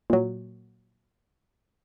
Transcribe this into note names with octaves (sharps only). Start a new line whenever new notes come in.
A#2 F#3